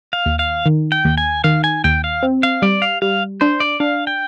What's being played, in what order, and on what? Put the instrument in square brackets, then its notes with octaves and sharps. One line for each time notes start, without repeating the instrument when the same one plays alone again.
[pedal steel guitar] F5
[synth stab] D#2
[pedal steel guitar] F5
[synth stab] D#3
[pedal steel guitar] G5
[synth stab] D#2
[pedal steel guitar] G#5
[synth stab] D#3 [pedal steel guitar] F5
[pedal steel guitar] G#5
[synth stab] D#2 [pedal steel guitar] G5
[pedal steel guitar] F5
[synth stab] C4
[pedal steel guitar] F5
[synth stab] G3 [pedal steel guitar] D5
[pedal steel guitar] F5
[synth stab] G3 [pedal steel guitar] F5
[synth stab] D4 [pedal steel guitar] C5
[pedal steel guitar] D5
[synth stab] D4 [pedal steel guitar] F5
[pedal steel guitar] G5